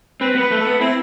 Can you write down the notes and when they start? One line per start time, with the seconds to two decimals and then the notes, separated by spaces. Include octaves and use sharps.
0.21 C4 B4
0.35 B3
0.41 B4
0.51 A3
0.61 A4
0.67 B3
0.80 C4 E4